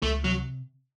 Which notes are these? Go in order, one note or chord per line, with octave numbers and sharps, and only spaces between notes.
C#2 A3
C3 F#3